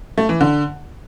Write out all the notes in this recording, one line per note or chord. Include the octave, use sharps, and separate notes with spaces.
A3
E3
D3